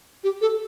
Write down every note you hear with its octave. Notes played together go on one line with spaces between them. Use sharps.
G4
A4